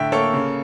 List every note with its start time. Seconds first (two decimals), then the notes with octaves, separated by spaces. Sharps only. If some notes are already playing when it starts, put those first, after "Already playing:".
Already playing: A2 D3 E5 G5
0.12 A#3 A4 C#5
0.34 C#3